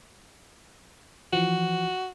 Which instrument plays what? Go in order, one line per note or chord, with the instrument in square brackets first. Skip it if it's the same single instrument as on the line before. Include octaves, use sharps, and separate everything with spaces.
[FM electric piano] E3 F3 [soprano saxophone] F#4